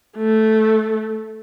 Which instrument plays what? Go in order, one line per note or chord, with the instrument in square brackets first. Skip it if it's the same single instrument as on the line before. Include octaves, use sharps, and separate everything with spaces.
[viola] A3